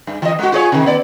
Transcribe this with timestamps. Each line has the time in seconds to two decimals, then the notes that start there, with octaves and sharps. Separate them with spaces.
0.07 G2
0.22 E3 D#5
0.39 G#3 F#4
0.52 F4 G#4 C#5
0.72 C3 D#3
0.86 B3 D5